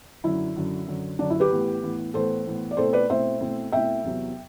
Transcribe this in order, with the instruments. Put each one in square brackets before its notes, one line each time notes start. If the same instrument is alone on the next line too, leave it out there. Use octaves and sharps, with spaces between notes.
[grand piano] F#2 D3 F#3 [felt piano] E4
[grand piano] F#2 D3 F#3
F#2 D3 F#3
[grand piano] F#2 D3 F#3 [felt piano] D4
[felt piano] E4
G4 B4
[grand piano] A2 E3 B3
A2 E3 B3
[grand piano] A2 E3 B3 [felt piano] A4 C5
[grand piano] A2 E3 B3
[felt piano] D5
[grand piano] B2 A3 C4 E4 [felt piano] A4 C5
[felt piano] B4 D5
[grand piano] B2 A3 C4 E4 [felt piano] C5 E5
[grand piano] B2 A3 C4 E4
[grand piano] B2 A3 C4 E4 [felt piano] E5 G5
[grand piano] E2 C3 F#3 B3